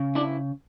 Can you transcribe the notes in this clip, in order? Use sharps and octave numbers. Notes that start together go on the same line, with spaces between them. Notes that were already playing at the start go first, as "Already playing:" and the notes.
Already playing: C#3
D4 E4